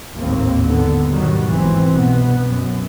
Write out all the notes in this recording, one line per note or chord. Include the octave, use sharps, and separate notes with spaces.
G#1 D#2 A2 D#3 A#3 C4
G#2 D3 B3
G#2 B2 D#3 F#3 G3
G#1 E3 C4
C2 G2 B2 B3
F#2